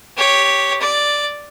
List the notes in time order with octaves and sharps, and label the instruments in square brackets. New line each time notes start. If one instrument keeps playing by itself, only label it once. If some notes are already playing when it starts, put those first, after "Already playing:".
[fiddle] G4 C#5
D5